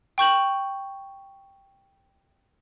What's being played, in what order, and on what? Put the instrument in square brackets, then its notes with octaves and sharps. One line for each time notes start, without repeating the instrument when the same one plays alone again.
[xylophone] G5 C#6 G6 F#7